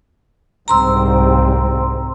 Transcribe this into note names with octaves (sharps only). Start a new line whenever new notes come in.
C2 G#2 C4 A#5 C6 E6